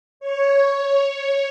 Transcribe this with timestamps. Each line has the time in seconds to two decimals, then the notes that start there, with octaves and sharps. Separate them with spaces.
0.20 C#5
0.95 C#5